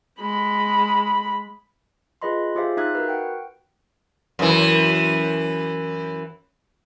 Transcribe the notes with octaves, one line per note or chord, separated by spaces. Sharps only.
G#3 B5
F4 G#4 B4 D#5 B5 C6
F4 G4 G#4 C5 E5 F5
D#4 E5 F5 D#6 F#6 G#6
F#4 A#4 B4
F#5 G5
F#2 E3